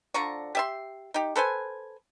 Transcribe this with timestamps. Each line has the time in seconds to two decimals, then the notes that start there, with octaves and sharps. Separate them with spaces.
0.14 D3 F3 A#5 C#6
0.55 G4 E5 C6
1.14 D#4 G4
1.36 A4 B4 C5 G#5